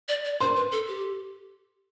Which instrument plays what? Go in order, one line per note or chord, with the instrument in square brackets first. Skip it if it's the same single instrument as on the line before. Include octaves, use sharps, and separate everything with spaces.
[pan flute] D5
D5
[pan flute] C5 [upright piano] C6
[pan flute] B4
A4
G4